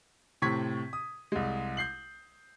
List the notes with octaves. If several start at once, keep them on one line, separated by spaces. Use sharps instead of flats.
A2 C3 C4 C#6 G#6 B6
D#6
C2 G#3
G6 C7 F#7